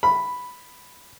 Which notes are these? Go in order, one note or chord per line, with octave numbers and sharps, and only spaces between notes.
B5